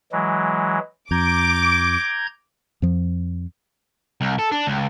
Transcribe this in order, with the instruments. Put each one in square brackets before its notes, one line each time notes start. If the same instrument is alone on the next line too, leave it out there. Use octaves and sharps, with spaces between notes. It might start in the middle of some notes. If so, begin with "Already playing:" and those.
[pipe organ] E3 F#3 G#3
[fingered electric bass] F2 [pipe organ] A#5 G6 G#6 [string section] D6
[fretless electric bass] F2 F3
[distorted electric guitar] C2
A4
D4
C#2